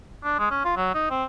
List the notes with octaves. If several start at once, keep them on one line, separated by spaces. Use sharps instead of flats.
D4
G#3
C#4
F4
F#3
D#4
C4